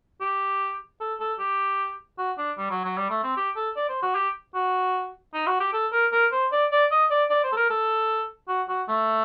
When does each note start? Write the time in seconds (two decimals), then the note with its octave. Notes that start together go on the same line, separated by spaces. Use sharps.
0.21 G4
1.01 A4
1.20 A4
1.39 G4
2.18 F#4
2.38 D4
2.58 G3
2.71 F#3
2.85 F#3
2.97 G3
3.10 A3
3.23 C4
3.37 G4
3.56 A4
3.76 D5
3.89 C5
4.03 F#4
4.15 G4
4.55 F#4
5.34 D#4
5.47 F#4
5.60 G4
5.73 A4
5.92 A#4
6.12 A#4
6.32 C5
6.52 D5
6.72 D5
6.91 D#5
7.11 D5
7.30 D5
7.44 C5
7.52 A4
7.57 A#4
7.70 A4
8.49 F#4
8.69 F#4
8.88 A3